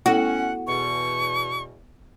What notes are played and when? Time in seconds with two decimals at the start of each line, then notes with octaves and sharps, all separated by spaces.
0.06 B3 C#4 E4 F#4 A4 F#5
0.67 E2 B2 C#6